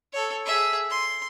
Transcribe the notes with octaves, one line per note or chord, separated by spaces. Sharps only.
A4 C#5
G#4 E5
C6